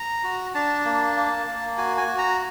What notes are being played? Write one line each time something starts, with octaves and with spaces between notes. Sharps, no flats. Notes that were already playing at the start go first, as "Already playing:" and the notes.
Already playing: A#5
F#4
D4 A5
A#3
A#3
A#3
F#4 G#5
G#5
F#4
A#5